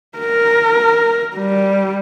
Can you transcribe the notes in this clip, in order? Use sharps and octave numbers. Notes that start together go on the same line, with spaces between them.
A#4
G3